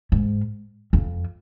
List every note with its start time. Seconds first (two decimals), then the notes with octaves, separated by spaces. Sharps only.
0.12 G#2
0.93 F2